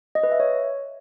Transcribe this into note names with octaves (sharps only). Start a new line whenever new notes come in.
D#5
B4
E5
C#5